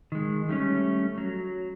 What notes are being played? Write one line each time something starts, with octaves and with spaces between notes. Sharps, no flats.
D#3 G#3
G3 A3 C#4
F#3